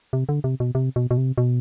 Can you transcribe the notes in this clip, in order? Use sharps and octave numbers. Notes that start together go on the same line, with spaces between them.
C3
D3
C3
B2
C3
B2
B2
C3
B2